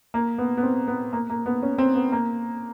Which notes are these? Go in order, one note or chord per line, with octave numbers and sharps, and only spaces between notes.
A#3
B3
B3
C4
B3
A#3
A#3
B3
C#4
C4
B3
A#3